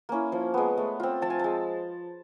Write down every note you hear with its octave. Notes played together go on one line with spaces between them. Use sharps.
A#3 C#4 E4
F3
G#3 B3
A3
C4 F4
F3 A5
G#5
G#3 A5